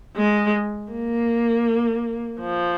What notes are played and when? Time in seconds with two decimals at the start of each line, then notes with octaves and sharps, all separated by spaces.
0.16 G#3
0.92 A#3
2.40 F3